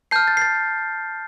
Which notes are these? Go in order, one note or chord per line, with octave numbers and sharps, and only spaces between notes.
A5 F6 G6 C7
A6
C7
A6